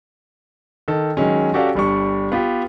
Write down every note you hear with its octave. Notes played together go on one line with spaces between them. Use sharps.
D#3 A4
D#3 F#3 G#3 C#4
C#4 F#4 G4 A4 D5 F5
G1 G3 D4 C#6
B3 F4 G4